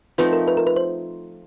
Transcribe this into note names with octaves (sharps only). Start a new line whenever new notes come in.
F3 A3 C4 D#4 B4
A#4
B4
A#4
B4
C5